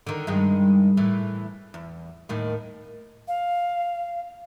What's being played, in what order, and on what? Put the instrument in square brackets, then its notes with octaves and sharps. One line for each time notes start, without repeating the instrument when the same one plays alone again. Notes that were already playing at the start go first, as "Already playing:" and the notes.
[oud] D3 D#3
G2 D#3 G#3
A2 E3
E2
D#2 A2 D#3
[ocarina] F5